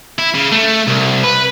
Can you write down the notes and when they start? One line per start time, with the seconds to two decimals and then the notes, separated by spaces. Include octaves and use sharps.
0.19 E4
0.35 C#3
0.52 A3
0.88 C2
1.24 B4